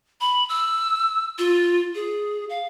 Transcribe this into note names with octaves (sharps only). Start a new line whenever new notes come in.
B5
E6
F4
G#4
F5